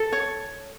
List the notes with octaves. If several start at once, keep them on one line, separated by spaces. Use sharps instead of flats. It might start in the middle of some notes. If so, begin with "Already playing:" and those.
Already playing: A4
C#5